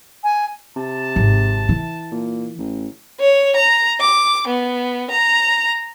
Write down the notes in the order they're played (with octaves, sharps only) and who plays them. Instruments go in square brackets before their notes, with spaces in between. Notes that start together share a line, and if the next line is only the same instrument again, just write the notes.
[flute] G#5
[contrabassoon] C3 [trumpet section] A5
[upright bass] G#1
E3
[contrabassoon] A#2
A1
[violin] C#5
A#5
D6
B3
A#5